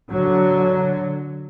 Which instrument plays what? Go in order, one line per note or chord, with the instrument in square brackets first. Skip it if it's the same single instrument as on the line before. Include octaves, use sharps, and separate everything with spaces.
[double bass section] D3 F#3